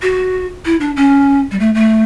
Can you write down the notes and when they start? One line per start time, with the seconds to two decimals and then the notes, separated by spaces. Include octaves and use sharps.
0.02 F#4
0.65 E4
0.80 D4
0.96 C#4
1.51 G3
1.60 A3
1.75 A3